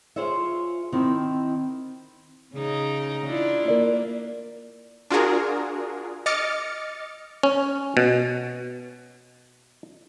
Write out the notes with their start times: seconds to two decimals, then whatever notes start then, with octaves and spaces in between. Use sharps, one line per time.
0.16 F4 G#4 C5 C#5 E5
0.92 D#3 C4 E4
2.54 C#3 D#4
3.26 D4 E4 F4
3.68 A#3 A#4 D5
5.11 D4 F4 F#4 G#4 A#4
6.26 D#5 D6 F6 A6 C#7
7.43 C#4
7.97 B2